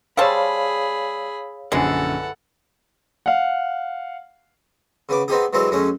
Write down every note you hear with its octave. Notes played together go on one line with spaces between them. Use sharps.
G3 G#4 C5 C#5 F5 A5 B5 E6
A#1 F#2 D3 E3 G#3 A4 F#5
F5 F#5
C#3 B3 D6
B3 C4 D#4 G4 G#4
E3 F#3 G#3 C4 A4
F#2 G#3 A3 C#4